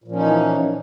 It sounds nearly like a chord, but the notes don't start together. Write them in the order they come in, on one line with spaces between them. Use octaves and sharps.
A#2 F3 C#4 D#4 E3